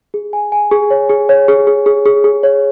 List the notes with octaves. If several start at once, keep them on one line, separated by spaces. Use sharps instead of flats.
G#4
G#5
G#5
G#4
C#5
G#4
C#5
G#4
G#4
G#4
G#4
G#4
C#5